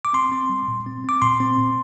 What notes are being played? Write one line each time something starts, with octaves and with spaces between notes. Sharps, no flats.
D6
C4 C6
C4
G3
A#2
C4
C4 D6
A#2 C6
C4
A#2